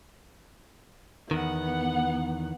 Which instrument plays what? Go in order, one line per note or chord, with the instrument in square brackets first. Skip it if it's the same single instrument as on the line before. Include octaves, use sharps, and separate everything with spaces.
[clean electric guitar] E2 D#3 [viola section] B3 F#5